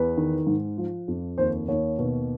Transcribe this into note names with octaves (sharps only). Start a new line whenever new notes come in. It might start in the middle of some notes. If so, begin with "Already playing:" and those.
Already playing: E2 B4
D#3
G#2
F3
F2
D#2 C5
D#2 C#5
B2